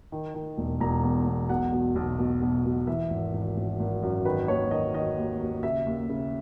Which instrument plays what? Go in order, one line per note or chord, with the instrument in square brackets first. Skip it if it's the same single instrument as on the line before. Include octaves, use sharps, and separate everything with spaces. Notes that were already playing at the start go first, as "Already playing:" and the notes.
[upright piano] D#3
D#3
E1
E1 A#5
E2
E2
B1 F#5
B2
B1
B2
B1
B2
E3 E5
G#1
G#1
G#1
G#1
F#2
D#3 B4
D#2 C#5
D#3 D#5
D#3 D#5
D#2
D#2
C#3 E5
D#2
C#3